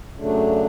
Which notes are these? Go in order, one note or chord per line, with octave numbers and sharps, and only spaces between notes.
F#2 C#3 F#3 A3 D4